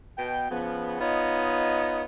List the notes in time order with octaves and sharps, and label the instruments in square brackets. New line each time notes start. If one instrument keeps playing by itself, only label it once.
[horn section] B2 G5
C#3 F3 B3
B3 D#4 F4 C#5 D#5